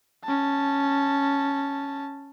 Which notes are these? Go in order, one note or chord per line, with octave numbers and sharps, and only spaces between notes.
C#4 A5